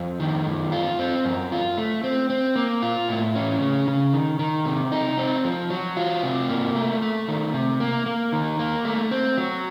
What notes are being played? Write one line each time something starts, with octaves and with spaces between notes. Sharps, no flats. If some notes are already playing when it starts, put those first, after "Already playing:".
Already playing: F2
D#3
F#2
F4
C4
F#2
F4
A3
C4
C4
A#3
F4
A2
C#4
C#3
C#3
D#3
D#3
C3
D#4
C4
F3
F#3
F4
C3
A#3
A3
A3
D#3
C3
A#3
A#3
D#3
A#3
A3
C4
F#3